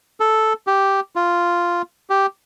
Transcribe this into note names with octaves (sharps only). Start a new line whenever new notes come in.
A4
G4
F4
G4